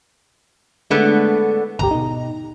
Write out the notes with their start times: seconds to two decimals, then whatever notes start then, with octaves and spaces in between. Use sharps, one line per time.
0.90 A2 D3 G#3 A3 B3
1.79 G#1 D2 G4 A#5
1.91 B2 D#4